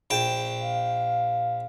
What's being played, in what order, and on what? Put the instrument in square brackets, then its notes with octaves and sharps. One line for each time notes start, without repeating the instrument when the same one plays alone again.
[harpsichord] A#1 G5 A5
[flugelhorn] F5